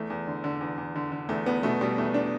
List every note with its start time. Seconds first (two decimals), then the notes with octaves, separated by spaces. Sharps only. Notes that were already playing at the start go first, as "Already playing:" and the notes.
Already playing: E2 A3
0.10 E2
0.27 D3
0.44 D3
0.61 E2
0.78 E2
0.96 D3
1.12 D3
1.29 E2 A3
1.46 E2 B3
1.63 B2 A3
1.81 B2 G3
1.98 E2 A3
2.14 D4